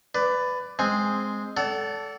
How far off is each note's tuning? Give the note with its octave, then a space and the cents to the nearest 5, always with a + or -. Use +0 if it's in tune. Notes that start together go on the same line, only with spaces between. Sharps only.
B4 +20 D5 +0
G#3 +0 C4 +0 G#5 +0
A4 +0 D5 -35 F#5 +35